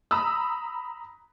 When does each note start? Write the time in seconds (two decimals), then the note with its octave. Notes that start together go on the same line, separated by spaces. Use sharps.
0.11 A#5 B5 D#6 E6